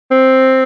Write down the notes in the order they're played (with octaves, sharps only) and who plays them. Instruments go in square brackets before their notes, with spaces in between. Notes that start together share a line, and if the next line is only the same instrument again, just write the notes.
[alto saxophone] C4